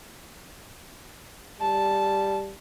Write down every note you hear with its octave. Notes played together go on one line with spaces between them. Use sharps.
G3 A5